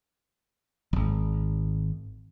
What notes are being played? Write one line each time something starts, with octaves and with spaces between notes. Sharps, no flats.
D1 G#1